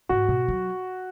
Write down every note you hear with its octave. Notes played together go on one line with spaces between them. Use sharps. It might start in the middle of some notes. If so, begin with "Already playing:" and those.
G#2 F#4
B2
F#3